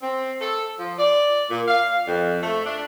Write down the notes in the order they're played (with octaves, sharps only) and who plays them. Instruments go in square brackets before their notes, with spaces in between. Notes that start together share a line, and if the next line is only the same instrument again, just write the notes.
[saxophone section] C4
A4
F3
D5
A#2
F5
F2
A3
D4